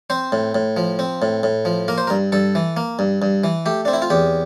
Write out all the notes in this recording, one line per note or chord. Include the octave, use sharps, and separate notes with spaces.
C4 C5
A2
A2
F3
C4
A2
A2
F3
A#3 A#4
C5
A#4
G2
G2 A4
E3
A#3
G2
G2
E3
A3 G4
C4 D4
E4
F4
E2 G4